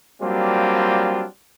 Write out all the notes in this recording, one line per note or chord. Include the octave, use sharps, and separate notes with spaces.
F#3 G3 A#3 C4 D4 F4